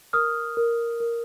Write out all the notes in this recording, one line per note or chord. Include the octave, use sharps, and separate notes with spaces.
A#4 D#6 F6
A#4
A#4